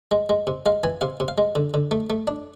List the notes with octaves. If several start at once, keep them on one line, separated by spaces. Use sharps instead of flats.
G#3
G#3
C3
G#3 F5
E3 G#5
C3 F5
C3
F5
G#3
D3
D3
A3
A3
D4